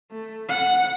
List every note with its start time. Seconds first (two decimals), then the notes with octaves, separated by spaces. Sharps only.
0.11 A3
0.49 F#5